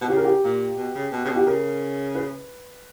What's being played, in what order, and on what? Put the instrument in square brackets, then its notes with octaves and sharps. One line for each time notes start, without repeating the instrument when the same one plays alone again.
[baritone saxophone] B2
[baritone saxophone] C#3 [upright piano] G4
[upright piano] A#4
G4
[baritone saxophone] A#2
B2
C#3
B2
C#3
B2
[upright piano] G4
[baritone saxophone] C#3 [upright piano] A#4
[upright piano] B4